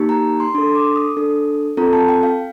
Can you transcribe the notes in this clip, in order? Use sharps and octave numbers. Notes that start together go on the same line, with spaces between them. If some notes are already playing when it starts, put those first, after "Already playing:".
Already playing: A#3 D#4 G4
A#5
C6
D4 A4 C6
D6
D#6
D4 A4
C4 F4 A4 A#5
A5
G5
F5